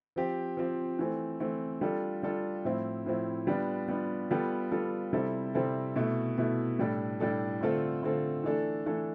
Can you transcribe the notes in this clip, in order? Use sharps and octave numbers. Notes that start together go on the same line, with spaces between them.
F3 C4 G4
F3 C4 G4
E3 A3 C4
E3 A3 C4
G3 D4 F4 A4
G3 D4 F4 A4
A2 F3 C4 E4
A2 F3 C4 E4
G3 B3 D4 F4
G3 B3 D4 F4
G3 B3 F4 A4
G3 B3 F4 A4
C3 G3 C4 E4 A4
C3 G3 C4 E4 A4
B2 A3 E4
B2 A3 E4
A2 G3 D4 A4
A2 G3 D4 A4
D3 A3 C4 F4 A4
D3 A3 C4 F4 A4
E3 A3 D4 A4
E3 A3 D4 A4